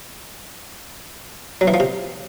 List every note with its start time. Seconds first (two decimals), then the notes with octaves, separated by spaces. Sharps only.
1.61 F#3
1.68 E3
1.74 F3
1.80 C3